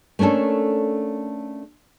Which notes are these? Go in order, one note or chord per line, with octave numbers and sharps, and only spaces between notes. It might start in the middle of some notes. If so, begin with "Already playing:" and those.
A3 A#3 C#4 D4 A4